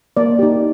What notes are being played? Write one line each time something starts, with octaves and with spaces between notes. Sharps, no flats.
A#3 D5
D#4 G4